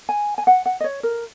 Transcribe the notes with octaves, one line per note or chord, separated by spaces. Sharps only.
G#5
G#5
F#5
F#5
D#5
C#5
A#4